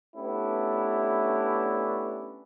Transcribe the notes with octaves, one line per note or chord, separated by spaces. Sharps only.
A3 B3 C#4 D4 E4 G4